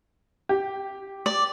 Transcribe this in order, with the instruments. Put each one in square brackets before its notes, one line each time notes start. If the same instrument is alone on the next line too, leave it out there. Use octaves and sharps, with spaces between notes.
[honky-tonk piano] G4
[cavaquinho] D5